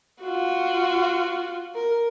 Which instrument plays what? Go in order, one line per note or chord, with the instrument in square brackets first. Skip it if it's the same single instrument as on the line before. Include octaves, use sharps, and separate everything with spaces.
[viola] F4 F#4
A#4